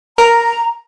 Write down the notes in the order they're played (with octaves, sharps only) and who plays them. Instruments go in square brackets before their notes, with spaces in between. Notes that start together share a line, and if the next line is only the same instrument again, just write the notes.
[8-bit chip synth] A#4 [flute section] A#5